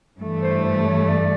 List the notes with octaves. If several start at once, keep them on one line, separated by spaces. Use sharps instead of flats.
G2 E3 A3
C5
C5
C#5
D5